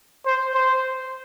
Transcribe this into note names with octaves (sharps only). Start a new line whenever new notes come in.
C5
C5